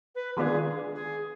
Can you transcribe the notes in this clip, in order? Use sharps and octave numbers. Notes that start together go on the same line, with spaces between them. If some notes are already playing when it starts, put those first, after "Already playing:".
B4
D#3 G#3 B3 D4 F4 G#4 B4
G#4